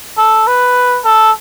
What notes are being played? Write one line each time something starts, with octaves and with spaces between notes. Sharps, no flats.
A4
B4
A4